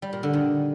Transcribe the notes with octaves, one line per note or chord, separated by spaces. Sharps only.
G3
A#2
D3
D#3